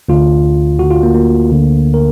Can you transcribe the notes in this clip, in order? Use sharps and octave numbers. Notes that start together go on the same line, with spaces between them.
D2 D3 F4
D2 D3 F#4
F4
A#3
A#3
D2 D3
A#4